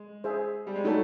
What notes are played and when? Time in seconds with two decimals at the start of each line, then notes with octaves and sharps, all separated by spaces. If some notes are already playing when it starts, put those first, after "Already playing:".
Already playing: G#3
0.24 G#4 C5 E5
0.67 G3
0.76 G#3
0.84 A3 D#4 F#4 A4 C#5